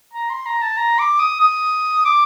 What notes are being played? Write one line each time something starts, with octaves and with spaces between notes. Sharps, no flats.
A#5
C6
A#5
A5
A#5
D6
D#6
D#6
D6